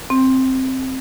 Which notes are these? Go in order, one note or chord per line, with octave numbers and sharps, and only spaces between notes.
C4